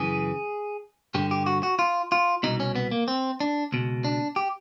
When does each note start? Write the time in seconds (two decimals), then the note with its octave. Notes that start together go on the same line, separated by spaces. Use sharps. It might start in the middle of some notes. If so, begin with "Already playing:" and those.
Already playing: F#2 C#3 E3 G#4
1.14 G2 D3 G4
1.31 G4
1.46 F#4
1.63 F#4
1.79 F4
2.12 F4
2.43 C2 B2 D#4
2.60 C#4
2.76 B3
2.91 A#3
3.08 C4
3.40 D4
3.72 C#2 B2
4.04 D4
4.36 G4